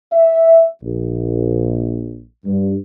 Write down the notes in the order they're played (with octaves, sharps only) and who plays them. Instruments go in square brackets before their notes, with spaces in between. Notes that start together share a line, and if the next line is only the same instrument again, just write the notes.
[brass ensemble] E5
A#1
G2